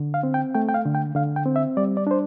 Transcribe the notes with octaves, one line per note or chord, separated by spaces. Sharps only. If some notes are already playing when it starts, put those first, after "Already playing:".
Already playing: D3
F5
C4
G5
A3 G5
G5
F5
D3
G5
D3 F5
G5
C4
E5
G3 D5
D5
D4 C5